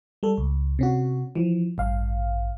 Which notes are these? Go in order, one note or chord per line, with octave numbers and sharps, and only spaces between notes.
G3 A4
C#2
C3 C#4 F#4
E3 F3
A1 G2 F5